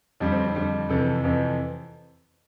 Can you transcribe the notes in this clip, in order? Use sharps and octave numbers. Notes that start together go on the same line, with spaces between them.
F2 D3 G3 D4
C4
D4
F2 D3 G3
F2 C3 E3 A4
F2 C3 E3